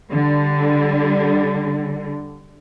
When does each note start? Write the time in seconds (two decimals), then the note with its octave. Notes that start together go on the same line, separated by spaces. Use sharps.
0.10 D3 G3